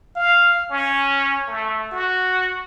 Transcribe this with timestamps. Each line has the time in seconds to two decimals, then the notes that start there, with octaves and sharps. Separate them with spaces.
0.16 F5
0.71 C#4
1.48 A3
1.91 F#4